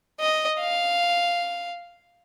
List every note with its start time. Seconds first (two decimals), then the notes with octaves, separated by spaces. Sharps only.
0.20 D#5
0.60 F5